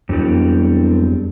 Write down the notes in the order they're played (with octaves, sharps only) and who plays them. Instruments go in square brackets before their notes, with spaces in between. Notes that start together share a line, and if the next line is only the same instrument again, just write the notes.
[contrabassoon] E1 [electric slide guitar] F2 F#3 G3